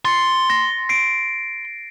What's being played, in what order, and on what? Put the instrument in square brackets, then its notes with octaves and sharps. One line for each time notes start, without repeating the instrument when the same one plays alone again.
[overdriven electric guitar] C6 [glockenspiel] A6 C#7
[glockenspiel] A#6
C7 D7